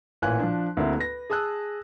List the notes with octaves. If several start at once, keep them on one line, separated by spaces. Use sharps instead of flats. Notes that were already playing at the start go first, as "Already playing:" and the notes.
A1 A#2 G#5 F#6
F3 D4
D2 A#3 C4 E4
B4 A#6
G#4 A5 D#6 E6 F#6